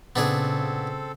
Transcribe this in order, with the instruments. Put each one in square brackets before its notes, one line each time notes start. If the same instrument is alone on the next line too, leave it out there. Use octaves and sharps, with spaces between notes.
[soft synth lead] A#2 [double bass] C#3 [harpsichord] B3 D4 G#4 [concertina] C4 A4